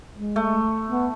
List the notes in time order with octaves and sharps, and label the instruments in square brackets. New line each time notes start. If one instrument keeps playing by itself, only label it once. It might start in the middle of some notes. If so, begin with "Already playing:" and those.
[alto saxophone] G#3
[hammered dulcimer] A3
[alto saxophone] B3